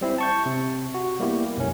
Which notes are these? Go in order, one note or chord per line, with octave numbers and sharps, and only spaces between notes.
G3 C4 E4
A5 C#6 G6
C3
F#4
G3 A#3 B3 E4 G4
B1 F#2 C#4